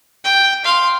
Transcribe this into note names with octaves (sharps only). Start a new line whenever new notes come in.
G5
F5 C6